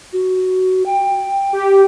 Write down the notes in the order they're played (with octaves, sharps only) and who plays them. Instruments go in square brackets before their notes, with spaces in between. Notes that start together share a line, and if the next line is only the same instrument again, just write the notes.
[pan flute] F#4
G5
[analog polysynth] G4